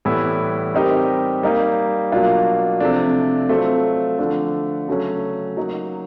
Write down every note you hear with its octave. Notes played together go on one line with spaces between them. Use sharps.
A2 E3 G3 B3 E4
G3 C4 D#4 G4 A#4
G3 A#3 D#4
B2 F#3 A#3 D4 F4
C3 F3 A3 D4
F#3 A3 C4 F4
D3 F3 A3 D4
C#3 F#3 A3 C#4
F#3 A#3 D#4